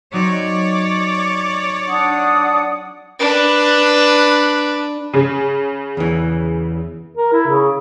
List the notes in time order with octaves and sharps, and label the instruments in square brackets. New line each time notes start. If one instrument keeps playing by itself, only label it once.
[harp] F#3 C4 D#4 [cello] C#5 D5
[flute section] D4 F#5 D#6
[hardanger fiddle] D4 B4
[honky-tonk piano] C#3
[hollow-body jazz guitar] E2 E3
[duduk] A#4
E4
C#3